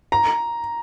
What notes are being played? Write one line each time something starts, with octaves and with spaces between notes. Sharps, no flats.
A#5